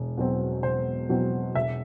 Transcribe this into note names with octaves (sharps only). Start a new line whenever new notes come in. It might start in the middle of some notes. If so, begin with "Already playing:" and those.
Already playing: E1
E2 B2 F#3 C4
E1 C5
E2 B2 F#3 C4
E1 E5